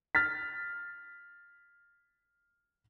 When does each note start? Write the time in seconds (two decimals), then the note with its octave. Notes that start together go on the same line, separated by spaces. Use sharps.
0.15 F6 A6 B6